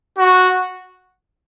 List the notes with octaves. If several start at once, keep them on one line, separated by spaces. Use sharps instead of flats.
F#4